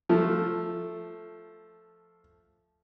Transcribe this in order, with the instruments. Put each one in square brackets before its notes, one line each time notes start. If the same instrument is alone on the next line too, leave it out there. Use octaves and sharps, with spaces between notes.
[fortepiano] F3 A3